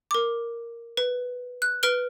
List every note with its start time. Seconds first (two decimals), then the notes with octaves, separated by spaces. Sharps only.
0.11 A#4 D6
0.97 B4
1.62 F#6
1.83 B4 F6 D7 G7